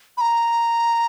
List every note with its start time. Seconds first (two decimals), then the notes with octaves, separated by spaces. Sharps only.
0.17 B5
0.21 A#5